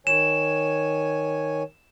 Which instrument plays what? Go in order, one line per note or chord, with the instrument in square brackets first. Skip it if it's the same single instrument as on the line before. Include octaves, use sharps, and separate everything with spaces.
[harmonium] D#3 C#5 G#5 [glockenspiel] E7